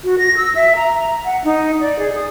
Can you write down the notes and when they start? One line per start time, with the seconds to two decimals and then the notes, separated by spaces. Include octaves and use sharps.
0.04 F#4
0.18 A#6
0.37 E6
0.55 E5
0.76 A#5
1.25 F#5
1.44 D#4
1.81 D5
1.99 G#4
2.16 D#6